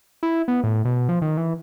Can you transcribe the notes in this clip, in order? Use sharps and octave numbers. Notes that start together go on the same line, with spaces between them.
E4
B3
A2
B2
F3
D#3
E3